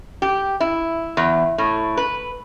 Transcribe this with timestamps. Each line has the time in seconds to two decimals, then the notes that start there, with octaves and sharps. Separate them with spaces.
0.22 G4
0.60 E4
1.17 E2
1.58 A2
1.97 B4